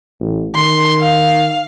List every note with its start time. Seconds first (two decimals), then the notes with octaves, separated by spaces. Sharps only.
0.20 A1
0.55 D#3 C6
1.00 F5